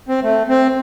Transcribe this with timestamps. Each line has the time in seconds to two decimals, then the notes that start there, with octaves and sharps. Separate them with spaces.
0.09 C4
0.23 A3
0.49 C4